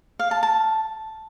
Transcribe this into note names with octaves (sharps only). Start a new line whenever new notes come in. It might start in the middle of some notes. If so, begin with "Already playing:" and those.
F5
A5
A5